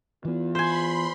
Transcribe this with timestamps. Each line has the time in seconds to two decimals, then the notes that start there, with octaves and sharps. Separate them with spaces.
0.25 E3 B3 F4
0.55 C5 G#5 B5 C6